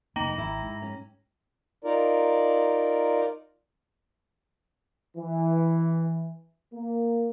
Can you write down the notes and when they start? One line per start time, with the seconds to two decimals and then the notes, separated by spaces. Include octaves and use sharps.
0.16 F1 A#3 D#4 G5 A#5 A#6
0.38 G#1 E4
0.63 G#2
0.82 C#4
1.84 D#4 F4 A#4 D5
5.17 E3
6.74 A#3